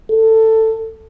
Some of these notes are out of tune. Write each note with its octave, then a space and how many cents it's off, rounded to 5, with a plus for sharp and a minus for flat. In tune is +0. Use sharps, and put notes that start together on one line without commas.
A4 +15